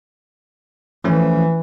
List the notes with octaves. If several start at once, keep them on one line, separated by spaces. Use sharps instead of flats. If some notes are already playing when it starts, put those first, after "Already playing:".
E3 F3 A3 C#4